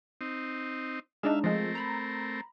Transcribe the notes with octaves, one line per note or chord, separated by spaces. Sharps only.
C4 D#4
G#3 D4 D#4 E5 F5
F3 G#3 A3 C4 A#4
A#5 B5